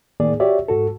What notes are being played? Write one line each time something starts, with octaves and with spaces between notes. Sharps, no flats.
A2 D#3 A#3 G#4 D5
F#4 G4 C#5 D5 E5
G#2 F#4 A4